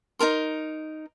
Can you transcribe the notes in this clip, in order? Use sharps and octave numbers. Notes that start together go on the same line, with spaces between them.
D#4 A4 A#4 C6